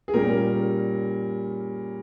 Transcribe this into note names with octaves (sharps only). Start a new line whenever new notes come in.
G#4
A#2 G3 C#4 A#4